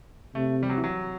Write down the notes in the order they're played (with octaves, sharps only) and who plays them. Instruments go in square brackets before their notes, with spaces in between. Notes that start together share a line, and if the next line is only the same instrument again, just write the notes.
[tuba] C3 [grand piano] A3
[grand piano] G3
F#3
E3
F#3